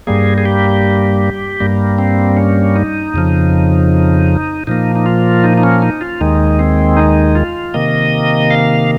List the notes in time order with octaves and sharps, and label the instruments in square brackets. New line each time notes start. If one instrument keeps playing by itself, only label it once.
[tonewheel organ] G2 G3 A#3 G#4
G#4
G4
G2 G3 A#3
C4
C#4
D#4
F2 C#3 F3
A#2 F3 A#3 D#4
D#4
F4
D#4
D#4
C#4
D#4
F4
D#2 D#3 G#3 D#4
C4
D#4
F4
C3 D#3 A#3 D#5
F5